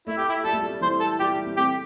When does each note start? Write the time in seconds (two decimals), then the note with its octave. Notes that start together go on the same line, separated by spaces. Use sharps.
0.07 A3 E4
0.18 G4
0.29 E4
0.44 G3 A4
0.53 A3
0.61 G3
0.81 E3 C5
1.00 A4
1.20 G3 G4
1.46 C4
1.57 A3 G4